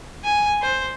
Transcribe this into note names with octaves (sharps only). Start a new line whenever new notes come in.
G#5
C5